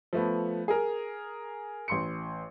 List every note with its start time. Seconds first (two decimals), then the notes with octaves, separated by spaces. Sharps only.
0.13 F3 A3 B3
0.68 G#4 A#4
1.88 A1 C6 C#7